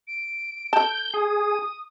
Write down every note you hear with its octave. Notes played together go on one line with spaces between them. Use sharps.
D7
A4 A5 G6
G#4 D#6